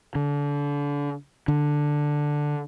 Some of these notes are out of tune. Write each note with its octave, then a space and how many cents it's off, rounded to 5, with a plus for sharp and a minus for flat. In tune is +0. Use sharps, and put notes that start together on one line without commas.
D3 -30
D3 +5